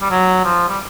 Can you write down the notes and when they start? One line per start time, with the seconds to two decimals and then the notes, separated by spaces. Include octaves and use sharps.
0.02 G3
0.11 F#3
0.45 F3
0.69 G3